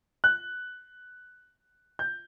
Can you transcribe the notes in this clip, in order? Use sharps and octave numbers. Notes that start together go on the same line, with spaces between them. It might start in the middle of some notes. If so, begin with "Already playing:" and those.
F#6
G6